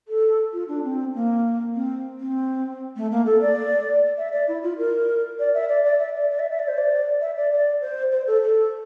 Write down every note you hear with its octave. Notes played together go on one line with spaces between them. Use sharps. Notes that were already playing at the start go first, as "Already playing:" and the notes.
A4
F4
D4
C4
A#3
C4
C4
A3
A#3
A4
D5
E5
D5
E4
F4
A#4
D5
E5
D5
D5
E5
D5
D5
E5
E5
D5
C5
D5
E5
D5
D5
C5
C5
A4
A4